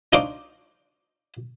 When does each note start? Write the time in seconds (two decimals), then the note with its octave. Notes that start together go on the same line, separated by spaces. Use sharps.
0.13 D4 D#4 F4 C5 C#6 D6